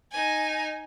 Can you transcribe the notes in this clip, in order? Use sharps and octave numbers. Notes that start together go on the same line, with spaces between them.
D#4 G#5